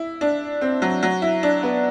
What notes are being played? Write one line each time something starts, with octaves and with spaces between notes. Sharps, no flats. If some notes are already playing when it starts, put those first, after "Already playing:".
Already playing: E4
D4
C4
F#3
F#3
E4
D4
B3